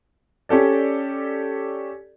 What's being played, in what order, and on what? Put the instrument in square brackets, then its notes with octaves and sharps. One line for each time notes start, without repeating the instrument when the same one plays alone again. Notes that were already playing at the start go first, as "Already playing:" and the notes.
[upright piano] C#4 G4 A4 D5